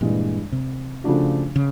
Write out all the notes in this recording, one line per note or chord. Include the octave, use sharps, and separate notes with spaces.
G2 A#2 E3 G#3
C3
C#3 F3 A3 D4 F#4
C#3